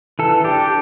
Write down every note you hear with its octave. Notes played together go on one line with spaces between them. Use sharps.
E3 A4
D4 G4